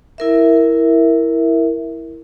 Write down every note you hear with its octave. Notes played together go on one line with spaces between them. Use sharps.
E4 A#4 E5